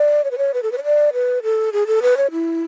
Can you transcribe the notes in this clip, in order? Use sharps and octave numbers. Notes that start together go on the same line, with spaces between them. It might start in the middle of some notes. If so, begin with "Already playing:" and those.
Already playing: D5
C#5
B4
C#5
B4
A4
B4
C#5
D5
B4
A4
G#4
A4
B4
C#5
E4